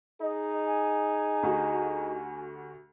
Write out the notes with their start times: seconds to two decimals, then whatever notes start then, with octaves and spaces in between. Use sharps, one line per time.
0.21 D#4 G#4 D#5
0.66 G#5
1.43 D2 F#4 G4